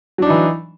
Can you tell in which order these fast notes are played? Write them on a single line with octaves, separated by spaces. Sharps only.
F#3 D4 D#4 E3